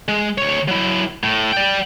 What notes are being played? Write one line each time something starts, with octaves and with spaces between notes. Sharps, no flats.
G#3
D2 C#5
F#3 E4
A2
D5 G5